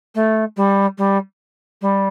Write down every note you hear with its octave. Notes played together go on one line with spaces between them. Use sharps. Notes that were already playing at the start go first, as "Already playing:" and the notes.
A3
G3
G3
G3